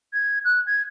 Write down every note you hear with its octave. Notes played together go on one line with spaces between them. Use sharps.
G#6
F#6
G#6